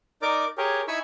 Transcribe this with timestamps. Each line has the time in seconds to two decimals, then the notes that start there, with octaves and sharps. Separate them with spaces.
0.22 D#4 A#4 D5 D6
0.58 G4 G#4 A#4 C#5
0.88 D#4 E4 G#5 B5 C#6 E6